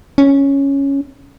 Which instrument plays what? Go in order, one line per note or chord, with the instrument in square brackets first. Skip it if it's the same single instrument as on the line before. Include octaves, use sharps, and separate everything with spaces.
[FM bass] C#4